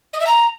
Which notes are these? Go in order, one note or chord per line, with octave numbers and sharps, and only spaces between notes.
D#5
E5
A#5